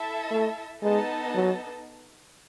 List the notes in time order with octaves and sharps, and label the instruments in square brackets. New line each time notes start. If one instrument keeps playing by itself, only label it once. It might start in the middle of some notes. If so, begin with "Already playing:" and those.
Already playing: [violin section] E4 A4 E5 A5
[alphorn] A3
[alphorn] G#3 [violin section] B3 D#4 A4 D#5 A5
[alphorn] F#3